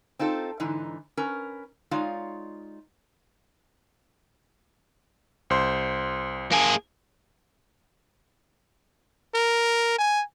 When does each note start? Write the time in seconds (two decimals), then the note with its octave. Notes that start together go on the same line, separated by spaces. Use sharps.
0.19 C4 D#4 F4 A4
0.60 G#2 D3 E3 D#4
1.17 C#4 A#4 B4
1.91 G#3 D#4 F4 C#5 D5 F5
5.50 C2 C5 C6
6.51 A#3 G#4
9.35 A#4
9.98 G#5